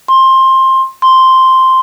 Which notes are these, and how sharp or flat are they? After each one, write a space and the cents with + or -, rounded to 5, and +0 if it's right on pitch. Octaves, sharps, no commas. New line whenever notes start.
C6 +15
C6 +0